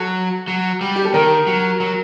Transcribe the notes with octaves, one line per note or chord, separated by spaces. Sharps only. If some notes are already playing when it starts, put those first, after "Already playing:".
Already playing: F#3 A4
F#3
G3
G4
A4
D#3 A#4
F#3
F#3